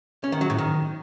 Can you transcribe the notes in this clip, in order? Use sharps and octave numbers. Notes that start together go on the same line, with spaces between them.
C#4
D#3
F#3
A2
D#3